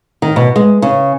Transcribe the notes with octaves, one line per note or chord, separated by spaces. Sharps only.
D#3
B2
G#3
C#3